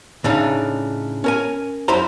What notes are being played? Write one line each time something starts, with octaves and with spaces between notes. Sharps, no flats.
A2 C#3 D4 D#4
C#4 A#4 G#5
F#2 E4 C5 A#5